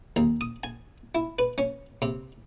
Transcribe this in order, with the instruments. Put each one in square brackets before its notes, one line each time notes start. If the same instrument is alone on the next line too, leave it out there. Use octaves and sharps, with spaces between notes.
[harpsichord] D#2
D#6
G#5
E4
B4
C#4
C3